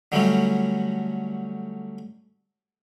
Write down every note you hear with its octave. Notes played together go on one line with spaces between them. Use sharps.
D3 F#3 G3 A3 C#4 F#4